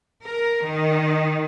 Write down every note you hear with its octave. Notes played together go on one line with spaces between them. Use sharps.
A#4
D#3